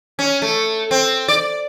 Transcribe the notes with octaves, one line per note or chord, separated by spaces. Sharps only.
C#4
A3
C4
D5